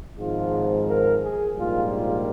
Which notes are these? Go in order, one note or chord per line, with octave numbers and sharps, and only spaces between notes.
G#1 G#2 F3 G#3 F4
A#4
G#4
A#1 G#2 G3 A#3 F4
F4